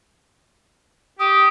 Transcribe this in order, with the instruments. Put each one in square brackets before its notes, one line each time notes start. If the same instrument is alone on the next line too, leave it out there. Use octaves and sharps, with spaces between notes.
[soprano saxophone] G4 [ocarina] D#6